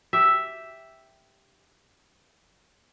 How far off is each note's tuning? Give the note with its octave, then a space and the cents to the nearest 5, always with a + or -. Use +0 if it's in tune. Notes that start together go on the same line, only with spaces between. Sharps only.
G4 +0 E5 +0